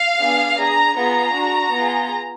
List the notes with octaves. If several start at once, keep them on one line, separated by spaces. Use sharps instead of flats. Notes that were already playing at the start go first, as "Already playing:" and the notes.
Already playing: F5
B3 D4 G#4
D4 G#4 A#5
B3 F4 G#4 A#5
D4 F#4
B3 F4 G#4